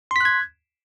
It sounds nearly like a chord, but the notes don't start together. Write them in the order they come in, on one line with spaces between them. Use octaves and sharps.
C6 B6 F#6 G#6